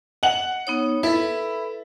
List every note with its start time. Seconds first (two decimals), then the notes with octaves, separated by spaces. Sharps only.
0.23 F#5 F#7
0.67 B3 D#4 C#5
1.03 E4 A4 B4